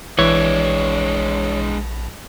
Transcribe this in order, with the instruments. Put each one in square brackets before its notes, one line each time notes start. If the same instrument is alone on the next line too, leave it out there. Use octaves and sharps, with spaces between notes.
[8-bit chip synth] A#1 [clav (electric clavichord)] E3 [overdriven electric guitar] G#3 D4 [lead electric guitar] C#5